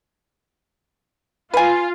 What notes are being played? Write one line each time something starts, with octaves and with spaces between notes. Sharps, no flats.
F4 B4 G#5